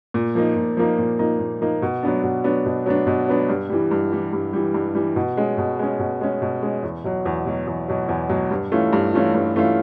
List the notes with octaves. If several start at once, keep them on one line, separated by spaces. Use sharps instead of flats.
A#2
F3 A#3 D#4
A#2
F3 A#3 D#4
A#2
F3 A#3 D#4
A#2
F3 A#3 D#4
B2
F#3 B3 D4
B2
F#3 B3 D4
B2
F#3 B3 D4
B2
F#3 B3 D4
G2
E3 G3
G2
E3 G3
G2
E3 G3
G2
E3 G3
B2
G#3 C#4
B2
G#3 C#4
B2
G#3 C#4
B2
G#3 C#4
E2
B2 F#3
E2
B2 F#3
E2
B2 F#3
E2
B2 F#3
G2
E3 A3 C#4 F4
G2
E3 A3 C#4 F4
G2
E3 A3 C#4 F4